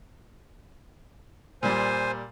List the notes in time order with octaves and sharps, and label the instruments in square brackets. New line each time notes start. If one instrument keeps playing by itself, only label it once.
[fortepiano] A#2 G3 [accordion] C5 G#5